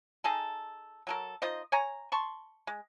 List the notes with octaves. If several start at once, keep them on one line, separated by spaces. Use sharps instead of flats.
D#4 G#4 A4
F#3 A4 A#4
D#4 F4 C5 D#5
C#5 G#5 A#5
A5 C6 C#6
G#3